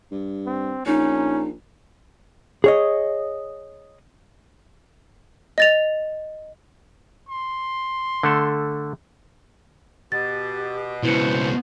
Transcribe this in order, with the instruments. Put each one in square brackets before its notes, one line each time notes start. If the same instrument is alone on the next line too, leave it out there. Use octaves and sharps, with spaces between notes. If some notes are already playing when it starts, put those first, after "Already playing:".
[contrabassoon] G2
[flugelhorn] C4
[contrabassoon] A#1 [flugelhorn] C#4 [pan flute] D#4
[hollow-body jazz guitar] G#4 C#5 D#5
[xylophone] D#5 A6 F7
[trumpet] C6
[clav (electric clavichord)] D3 A3 A4
[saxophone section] B2 [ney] G4 [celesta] A6
[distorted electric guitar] C#2 B2 [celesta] E4 C#7 [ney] B4 [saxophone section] C5